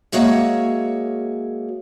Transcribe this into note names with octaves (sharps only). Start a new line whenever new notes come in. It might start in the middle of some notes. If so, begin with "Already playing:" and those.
G#3 A#3 F#4 G#4 C#5 E5